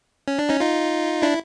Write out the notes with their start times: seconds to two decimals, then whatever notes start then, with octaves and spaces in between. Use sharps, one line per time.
0.28 C#4
0.39 D4
0.49 C#4 D#4
0.60 D#4 F4
1.22 D4 E4